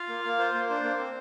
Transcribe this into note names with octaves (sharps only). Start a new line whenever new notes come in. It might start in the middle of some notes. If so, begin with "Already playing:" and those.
Already playing: F4 F5
A#3
A#3
F4 C5
A#3
D4 C5
A#3
C4